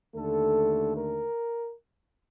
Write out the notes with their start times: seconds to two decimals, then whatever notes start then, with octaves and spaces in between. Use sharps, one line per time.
0.16 D#2 D3 A3 A4
0.97 A#4